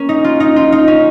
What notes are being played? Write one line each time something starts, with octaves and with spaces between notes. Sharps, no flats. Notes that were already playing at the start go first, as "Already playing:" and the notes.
Already playing: A#3 C#4
D#4
F4
D#4
F4
D#4
C#4